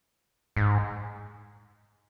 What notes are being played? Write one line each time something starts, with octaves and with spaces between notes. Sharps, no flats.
G#2